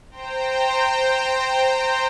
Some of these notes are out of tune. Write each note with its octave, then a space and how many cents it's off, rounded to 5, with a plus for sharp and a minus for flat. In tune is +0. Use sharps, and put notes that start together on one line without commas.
C5 +0 G5 +0 A#5 -25